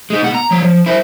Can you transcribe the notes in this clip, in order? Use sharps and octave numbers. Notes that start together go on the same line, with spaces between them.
G#3 D#4
B2 F#5
A#5
F3 C#5
F3
E4 C5